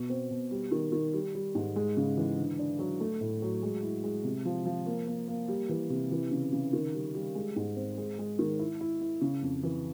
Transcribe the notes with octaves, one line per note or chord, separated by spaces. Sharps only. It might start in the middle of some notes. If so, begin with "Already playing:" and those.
Already playing: B2
C4
B2
G3
D#3
D#3
G3
G3
G#2
G#3
C#3
E3
D3
D4
F#3
A3
A2
F#3
G#3
E4
G#3
C3
F3
F3
A#3
A#3
A#3
G3
E3
C3
E3
C#3
C#3
D#3
G3
G3
G#3
G#2
C4
G#3
G#3
D#3
E4
E4
E4
C#3
F2
E3